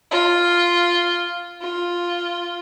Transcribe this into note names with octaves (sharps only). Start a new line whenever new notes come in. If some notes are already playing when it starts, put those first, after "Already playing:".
F4
F4